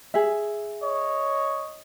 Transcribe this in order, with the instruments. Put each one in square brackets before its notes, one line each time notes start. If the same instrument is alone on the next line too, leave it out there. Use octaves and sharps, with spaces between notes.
[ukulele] G#4 E5
[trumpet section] C#5 D#5